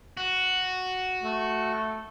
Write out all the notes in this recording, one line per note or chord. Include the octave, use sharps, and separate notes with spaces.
F#4
A3